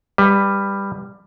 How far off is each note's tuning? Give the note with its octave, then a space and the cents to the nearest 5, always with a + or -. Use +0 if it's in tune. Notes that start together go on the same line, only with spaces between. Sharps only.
G3 +15 B4 +0